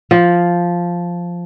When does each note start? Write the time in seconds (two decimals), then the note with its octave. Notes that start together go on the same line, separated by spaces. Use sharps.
0.11 F3